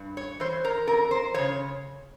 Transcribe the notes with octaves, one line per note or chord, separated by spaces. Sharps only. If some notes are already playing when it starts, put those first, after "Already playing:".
Already playing: G2
C#5
E3 C5
A#4
F2 A#4
C5
C#3 E3 C#5